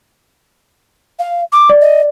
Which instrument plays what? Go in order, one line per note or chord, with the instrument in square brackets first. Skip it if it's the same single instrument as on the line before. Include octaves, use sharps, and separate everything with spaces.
[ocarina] F5
D6
[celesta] D5
[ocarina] D#5